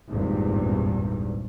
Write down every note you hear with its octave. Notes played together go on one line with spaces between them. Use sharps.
G#1 E2 G2 A#2